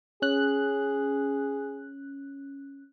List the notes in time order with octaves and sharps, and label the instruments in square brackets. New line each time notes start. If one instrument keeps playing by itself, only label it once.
[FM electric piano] C#4 F#6 [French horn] G#4